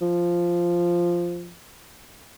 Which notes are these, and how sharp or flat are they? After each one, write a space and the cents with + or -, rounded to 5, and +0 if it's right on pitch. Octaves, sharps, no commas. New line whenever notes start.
F3 -5